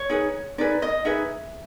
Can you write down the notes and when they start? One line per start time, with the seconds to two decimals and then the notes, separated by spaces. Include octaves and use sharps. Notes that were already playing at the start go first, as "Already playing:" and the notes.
Already playing: C#5
0.10 D#4 G#4 B4
0.58 D#4 G#4 B4 D5
0.82 D#5
1.05 D#4 G#4 B4 E5